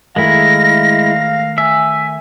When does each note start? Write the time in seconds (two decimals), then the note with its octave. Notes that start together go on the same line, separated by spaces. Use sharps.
0.16 D#3 G#3 A3 E4 F5 G5 A#6
1.58 E5 G#5